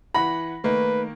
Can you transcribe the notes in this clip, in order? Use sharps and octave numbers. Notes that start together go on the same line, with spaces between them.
E3 F#5 B5 A#6
D#3 A3 A#3 D#4 B4